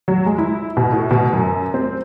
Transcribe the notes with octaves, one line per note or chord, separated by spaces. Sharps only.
F#3
G#3
E4
B2
A2
B2
F#2
C4